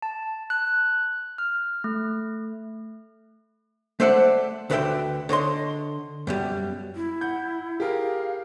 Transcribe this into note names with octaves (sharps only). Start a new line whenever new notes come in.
A5
F#6
F6
A3
A3 C5 D5 E5 F#5
D2 D3 B4 D5 E5 G5
D3 C#5 D#5 C6
F#2 B2 G3
E4
F#5 G6
G4 G#4 A#4 F5